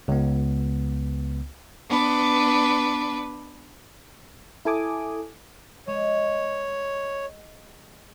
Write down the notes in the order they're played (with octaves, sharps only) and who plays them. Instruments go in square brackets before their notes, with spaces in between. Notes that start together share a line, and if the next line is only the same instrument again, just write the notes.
[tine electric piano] C#2 B3
[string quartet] B3 D4 B4
[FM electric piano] E4 A4 G#5 D6 D#6
[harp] G#3 [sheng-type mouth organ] C#5